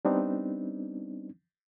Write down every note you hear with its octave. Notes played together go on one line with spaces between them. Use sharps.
G3 B3 C4 D4 D#4